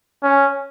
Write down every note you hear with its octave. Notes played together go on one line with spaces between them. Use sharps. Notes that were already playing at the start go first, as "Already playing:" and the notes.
C#4